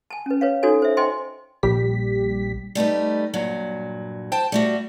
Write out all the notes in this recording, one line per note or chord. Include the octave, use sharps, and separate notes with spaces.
G#5 A5
C#4 B4
B4 C#5 F5
D4 D#4 F#4 A4 C#5 G#5
C5 E5
C5 D#5 G5 G#5 C6
A#1 G3 G4 B6
G3 A3 D#4 B4
G2 A#2 F#3
C5 G5 A5
G3 A3 F#4